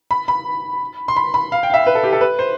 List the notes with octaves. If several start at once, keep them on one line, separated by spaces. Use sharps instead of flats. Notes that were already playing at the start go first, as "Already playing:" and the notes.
B5
B5
C6
B5
B5
F5
G5
F5
E5
B4
A4
G4
A4
B4
C5